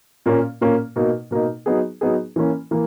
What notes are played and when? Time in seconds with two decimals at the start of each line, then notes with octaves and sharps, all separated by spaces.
0.26 A#2 A#3 C#4
0.61 A#2 A#3 C#4
0.96 B2 A#3 D#4
1.31 B2 A#3 D#4
1.66 F#3 B3 D#4 G#4
2.01 F#3 B3 D#4 G#4
2.36 E3 A#3 C#4
2.71 E3 A#3